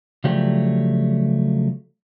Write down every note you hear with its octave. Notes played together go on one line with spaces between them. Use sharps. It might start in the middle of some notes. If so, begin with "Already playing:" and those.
C#3 F3 F#3 A3 G4 D5